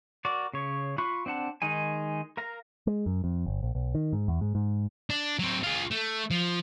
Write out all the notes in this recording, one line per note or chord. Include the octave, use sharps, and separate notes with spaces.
F#4 A#4 D5
C#3 C#5
F4 B5 C#6 F#6
C4 D4 F#5 A5
D#3 G#3 D#4 G#5
A#4 F5 A#5
G#3
F#2
F2
G1
A#1
B1
D#3
G#2
E2
G#2
G#2
D4
F#3 C4
F4 G#4
A3
F3